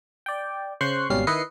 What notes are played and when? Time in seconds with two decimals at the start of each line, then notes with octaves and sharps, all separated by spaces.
0.26 D5 G5
0.81 C#3 C5 C6 C#6 F#6 C7
1.10 G#1 B2 G3 C#4 F5 C7
1.27 D#3 E4 B4 D#5 C7 C#7